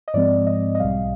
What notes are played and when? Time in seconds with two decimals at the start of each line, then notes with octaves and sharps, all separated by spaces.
0.08 D#5
0.14 G#2 F3 G#3 C4 D5
0.47 D#5
0.75 D#5
0.80 B1 B2 G3 F5